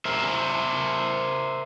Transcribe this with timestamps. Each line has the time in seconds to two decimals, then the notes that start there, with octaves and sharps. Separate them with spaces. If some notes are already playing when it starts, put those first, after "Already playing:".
0.05 A#4 C5 E5